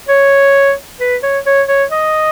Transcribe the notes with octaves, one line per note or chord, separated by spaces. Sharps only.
C#5
B4
C#5
C#5
C#5
D#5